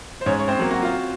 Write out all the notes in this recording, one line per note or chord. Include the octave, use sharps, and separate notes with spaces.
C5
G#2 C#4 C#5
C#5
C4 C5
F#3 A#3
F#4
F4